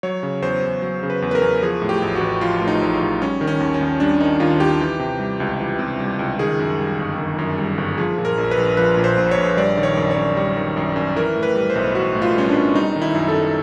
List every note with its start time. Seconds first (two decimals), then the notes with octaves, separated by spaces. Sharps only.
0.03 F#3 C#5
0.23 C#3
0.42 E2 C5
0.62 E2
0.82 F#3
1.03 C#3
1.10 B4
1.22 E2
1.31 B4
1.35 A#4
1.42 E2
1.63 F3 G#4
1.82 A2
1.89 G4
2.02 A1
2.15 F#4
2.21 A1
2.41 F3 F4
2.61 A2
2.67 D#4
2.82 A1
3.01 A1
3.21 G3 C#4
3.41 D#3
3.47 C#4
3.60 D#2
3.74 C#4
3.81 D#2
4.00 G3 D4
4.21 D#3 D#4
4.40 D#2 F4
4.60 D#2 G4
4.81 E3
4.99 C3
5.20 G3
5.40 C#2
5.60 E3
5.79 C3
6.00 G3
6.19 C#2
6.39 D#3 G#4
6.59 F#2
6.78 G3
6.98 G1
7.18 D#3
7.39 F#2
7.58 G3
7.78 G1
7.98 F3 G#4
8.18 A#2
8.25 A#4
8.38 A#1
8.51 B4
8.57 A#1
8.77 F3 B4
8.97 A#2
9.04 C5
9.18 A#1
9.31 C#5
9.37 A#1
9.57 G3 D5
9.77 D#3
9.83 C#5
9.97 F#2
10.11 C#5
10.16 F#2
10.37 G3
10.56 D#3
10.77 F#2
10.96 F#2
11.16 E3 A#4
11.36 A2
11.43 B4
11.55 G3
11.70 C5
11.75 B1
11.95 E3 F#4
12.15 A2
12.22 F4
12.35 G3 C#4
12.49 D4
12.55 B1
12.75 G3 D#4
12.96 D#3
13.02 E4
13.15 F#2
13.28 A4
13.35 F#2